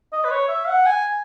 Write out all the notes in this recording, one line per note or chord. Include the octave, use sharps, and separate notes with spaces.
D#5
B4
C#5
E5
F#5
G#5